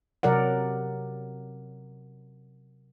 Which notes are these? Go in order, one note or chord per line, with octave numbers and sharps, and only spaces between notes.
C3 F#3 A#4 D5 F#5